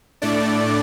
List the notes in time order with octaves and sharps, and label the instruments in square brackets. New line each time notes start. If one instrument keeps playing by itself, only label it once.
[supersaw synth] A2 A3 D4 D5